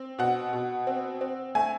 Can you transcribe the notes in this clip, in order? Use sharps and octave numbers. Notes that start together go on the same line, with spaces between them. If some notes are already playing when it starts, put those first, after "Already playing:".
Already playing: C4
B2 F#5
B2
C4
C4
A3 G#5